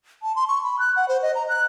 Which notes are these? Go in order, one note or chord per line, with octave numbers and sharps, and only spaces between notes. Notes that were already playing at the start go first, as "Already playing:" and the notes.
A5
C6
C#6
B5
F#6
F#5
C5
D#5
A#5
F#6